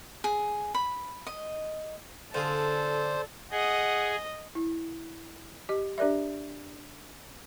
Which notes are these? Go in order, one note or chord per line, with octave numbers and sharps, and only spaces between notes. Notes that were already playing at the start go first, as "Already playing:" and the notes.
G#4
B5
D#5
D3 D4 F4 G#4 A4 C5
G#4 D#5 F#5
E4
G4 D#5
D4 G4 A#4 D5 E5